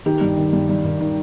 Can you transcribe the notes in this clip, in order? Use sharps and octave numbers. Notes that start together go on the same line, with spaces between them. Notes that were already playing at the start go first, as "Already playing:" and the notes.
D#3 G4
G2
D#3
G2
G2
D#3
D#3